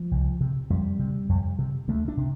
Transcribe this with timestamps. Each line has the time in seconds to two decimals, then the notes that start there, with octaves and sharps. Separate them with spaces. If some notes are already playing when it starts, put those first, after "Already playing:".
Already playing: F3
0.11 C2
0.41 C3
0.70 F2 G3
0.99 C3
1.29 F2
1.59 C3
1.88 D2 A3
2.08 D4
2.17 C3